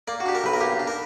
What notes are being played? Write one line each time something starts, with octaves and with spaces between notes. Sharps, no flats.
A#3 D5
F#4
D4 G4
A#4
B1 B4
A#4
A#3 G4
D4
A#4